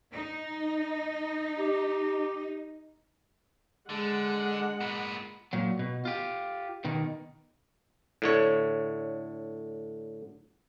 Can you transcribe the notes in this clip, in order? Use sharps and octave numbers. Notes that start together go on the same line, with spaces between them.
D#4
G4
D3 G#3 F#5
A#2 B3
A#2 F#3
B2
F4 G4
B2 D#3
A2 D3 C#5